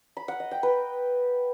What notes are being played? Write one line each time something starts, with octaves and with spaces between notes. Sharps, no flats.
B5
F#5
D#5
G5
B4